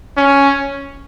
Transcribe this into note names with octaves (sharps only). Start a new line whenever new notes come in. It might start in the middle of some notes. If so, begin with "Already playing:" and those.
C#4